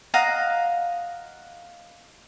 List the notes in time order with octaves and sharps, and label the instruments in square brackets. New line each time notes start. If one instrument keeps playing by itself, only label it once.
[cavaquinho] D#5 F5 F#5 A#5